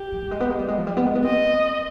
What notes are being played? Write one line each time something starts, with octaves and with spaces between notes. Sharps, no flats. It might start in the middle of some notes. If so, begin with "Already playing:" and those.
Already playing: G4
F3
G3
G#3
B3
G#3
G3
G#3
F3
G3
B3
G#3
B3
C4 D#5